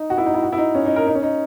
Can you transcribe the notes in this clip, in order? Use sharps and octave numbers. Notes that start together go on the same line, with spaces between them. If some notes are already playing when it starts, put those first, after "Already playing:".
Already playing: D#4
F#4
E4
D#4
E4
F#4
E4
D#4
C#4
D#4
A#4
D#4
C#4
D#4